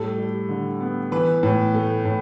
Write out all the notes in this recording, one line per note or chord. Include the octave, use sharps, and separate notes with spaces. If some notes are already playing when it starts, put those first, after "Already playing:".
Already playing: A2 G3 A4
G3
D3
B3
E3 B4
A2
A3
A2